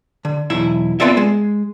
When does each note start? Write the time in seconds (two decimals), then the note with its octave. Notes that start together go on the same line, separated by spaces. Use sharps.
0.25 D3
0.50 B1 E2 E4 E5
1.00 B3 C4 F4 A4 D5 E5
1.17 G#3